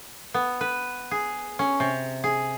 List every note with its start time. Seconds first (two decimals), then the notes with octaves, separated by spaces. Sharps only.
0.34 B3
0.61 B4
1.11 G#4
1.59 C#4
1.80 C3
2.24 G#4